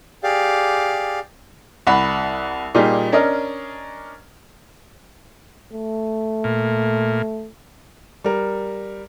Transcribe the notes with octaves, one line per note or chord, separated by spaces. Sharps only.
G4 G#4 D5 F5
C2 F#5 B5
A#2 G3 D#4 F4 G4 G#4
C#4 D4 A#4 D#5
A3
A#2
G3 A#4